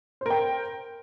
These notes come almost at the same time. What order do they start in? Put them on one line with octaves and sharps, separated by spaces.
C5 A#4 G5